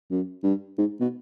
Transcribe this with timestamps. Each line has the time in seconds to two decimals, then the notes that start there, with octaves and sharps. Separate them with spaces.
0.10 F#2
0.43 G2
0.78 G#2
1.00 B2